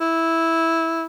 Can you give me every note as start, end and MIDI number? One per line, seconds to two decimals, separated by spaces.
0.01 1.06 64